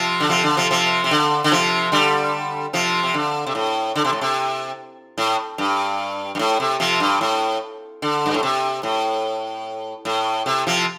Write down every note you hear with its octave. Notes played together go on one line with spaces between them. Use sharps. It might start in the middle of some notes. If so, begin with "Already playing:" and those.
Already playing: C3 F3
D3
C3 F3
D3
C3 F3
C3 F3
C3
D3
D3
C3 F3
D3 G3
C3 F3
C3
D3
C3
A2
D3
C3
A2
C3
A2
G2
G2
A2
C3
C3 F3
G2
A2
D3
G2
A2
C3
A2
A2
C3
C3 F3